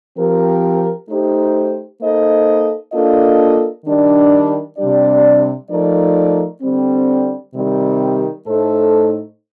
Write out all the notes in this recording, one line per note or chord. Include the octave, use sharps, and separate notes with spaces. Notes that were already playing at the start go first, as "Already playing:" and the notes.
F3 C4 G4 A#4
A3 D#4 G4 C5
A#3 D#4 A4 C5 D#5
A#3 D4 F4 A4 D#5
D#3 G3 D4
C3 G3 D4 G4 D5
F3 A3 D#4 A#4 D5
D3 G3 C4
C3 D#3 G3
A2 A3 D#4 A4 C5